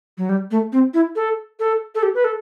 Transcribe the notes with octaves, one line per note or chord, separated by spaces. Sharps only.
F#3
G3
A3
C4
E4
A4
A4
A4
G4
B4
A4